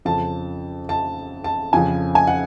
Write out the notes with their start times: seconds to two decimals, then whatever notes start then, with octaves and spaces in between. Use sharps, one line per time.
0.05 F2 C#3 F3 A5
0.89 A5
1.44 A5
1.73 F2 C#3 F3 G#5
2.15 G#5
2.27 F#5